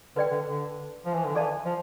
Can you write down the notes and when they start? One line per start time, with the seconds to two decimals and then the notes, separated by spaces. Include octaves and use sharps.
0.16 D3 B4 D5 G5
0.31 D3
0.46 D3
1.06 F3
1.15 E3
1.25 D3
1.35 E3 A4 D5 F5 A5
1.65 F3